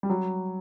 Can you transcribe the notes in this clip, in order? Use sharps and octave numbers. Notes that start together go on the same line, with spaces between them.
G3
F#3